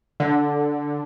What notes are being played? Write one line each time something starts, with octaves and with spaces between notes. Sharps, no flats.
D3